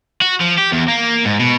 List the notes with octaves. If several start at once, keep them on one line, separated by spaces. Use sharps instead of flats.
F#4
F3
G4
E2
A#3
G#2
B2